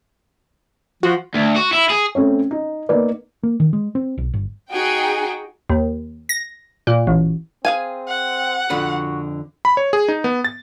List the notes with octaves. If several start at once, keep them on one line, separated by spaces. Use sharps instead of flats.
F3 F#4
D2
F#4
E4
G#4
A3 C4 C#4 C#5
D#4
A#3 B3 D#4 B4 D5
A#3
D#3
G#3
C4
B1
G1
D#4 F#4 G#4 G5
D#2
A#6
A#2
A1
C4 G#4 F5 G#5
F#5
F2 D3 F#4 B4
B5
C#5
G#4
D#4
B3
A6